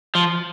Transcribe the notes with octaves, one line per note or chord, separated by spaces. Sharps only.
F3